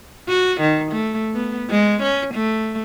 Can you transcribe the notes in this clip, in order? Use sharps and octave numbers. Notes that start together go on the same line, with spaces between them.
F#4
D#3
A3
B3
G#3
C#4
A3